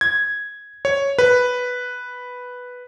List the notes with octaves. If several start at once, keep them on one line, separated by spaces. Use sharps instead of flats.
G#6
C#5
B4